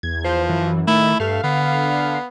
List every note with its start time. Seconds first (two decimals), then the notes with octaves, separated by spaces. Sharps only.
0.03 E2 G#6
0.25 F3 C5
0.49 F#2 E3
0.87 D#3 A3 E4
1.20 G2 A3 F5
1.44 D3 B3